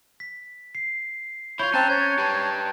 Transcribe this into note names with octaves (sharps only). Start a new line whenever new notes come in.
B6
C7
E4 F4 C#5 B5 G6 G7
C4 C#4 A5 A#5 F#6
C#5 G#6 A6
G4 B4 A5